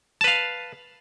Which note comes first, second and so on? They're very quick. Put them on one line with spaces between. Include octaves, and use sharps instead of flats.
A5 B4 F5